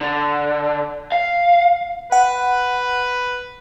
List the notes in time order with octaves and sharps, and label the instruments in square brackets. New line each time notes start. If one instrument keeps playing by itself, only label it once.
[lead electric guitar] D3
F5
[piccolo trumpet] B4 [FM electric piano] F#5